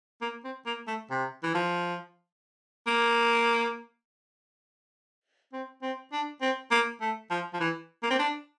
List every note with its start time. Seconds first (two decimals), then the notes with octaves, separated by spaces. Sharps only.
0.21 A#3
0.44 C4
0.66 A#3
0.88 A3
1.10 C3
1.43 E3
1.55 F3
2.87 A#3
5.53 C4
5.82 C4
6.12 D4
6.42 C4
6.71 A#3
7.01 A3
7.31 F3
7.54 F3
7.60 E3
8.03 A#3
8.11 C4
8.19 D4